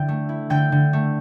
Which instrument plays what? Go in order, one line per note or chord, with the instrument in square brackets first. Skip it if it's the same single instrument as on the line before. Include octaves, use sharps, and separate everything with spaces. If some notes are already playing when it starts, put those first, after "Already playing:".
Already playing: [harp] D3 E4 G5
A3
E4
D3 G5 G6
D3
A3